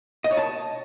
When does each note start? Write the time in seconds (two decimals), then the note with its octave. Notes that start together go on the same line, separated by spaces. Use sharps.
0.24 D#5
0.31 C#5
0.37 A5